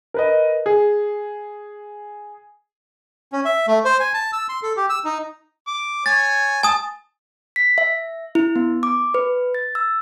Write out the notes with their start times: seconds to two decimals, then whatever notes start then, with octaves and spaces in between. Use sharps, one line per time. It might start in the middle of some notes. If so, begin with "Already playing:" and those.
0.14 A#4 B4 D#5
0.66 G#4
3.32 C#4
3.45 E5
3.67 A3
3.85 C5
4.00 G#5
4.14 A5
4.33 E6
4.49 C6
4.63 A4
4.77 G4
4.90 E6
5.05 D#4
5.67 D6
6.06 C#5 G#5 A6
6.63 G#5 A5 D#6
7.56 B6
7.78 E5
8.35 E4
8.56 B3
8.83 D6
9.14 B4
9.55 A6
9.75 E6